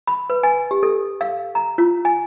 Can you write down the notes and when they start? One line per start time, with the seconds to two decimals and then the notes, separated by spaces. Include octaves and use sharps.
0.07 B5
0.30 B4
0.43 G#5
0.71 G4
0.83 A4
1.21 F5
1.55 A#5
1.78 F4
2.05 G#5